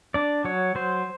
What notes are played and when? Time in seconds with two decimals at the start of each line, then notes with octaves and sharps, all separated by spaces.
0.14 D4 D5
0.45 F#3 C#5
0.75 F#3 C5